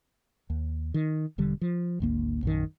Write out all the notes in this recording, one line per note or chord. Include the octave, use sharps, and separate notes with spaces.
D#2
D#3
E1 D3 G3
F3
G#1 D2 A#3
A#1 F#2 D#3